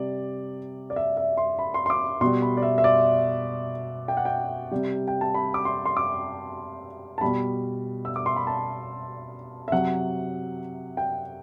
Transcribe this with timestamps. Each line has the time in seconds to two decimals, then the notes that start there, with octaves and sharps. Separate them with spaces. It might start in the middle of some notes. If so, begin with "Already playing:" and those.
Already playing: C3 G3 D5
0.90 D5
0.96 E5
1.17 E5
1.37 C6
1.59 B5
1.74 C6
1.86 C6
1.90 D6
2.21 B2 G3 C6
2.42 B5
2.57 D5
2.62 E5
2.78 E5
2.84 D5
4.08 G5
4.17 F#5
4.25 G5
4.71 C3 G3
5.08 G5
5.21 A5
5.34 B5
5.54 D6
5.65 C6
5.86 C6
5.97 D6
7.18 A5
7.21 B2 G3 B5
8.05 E6
8.16 D6
8.26 C6
8.36 B5
8.47 A5
9.68 E5
9.72 C3 F#3 F#5
10.97 G5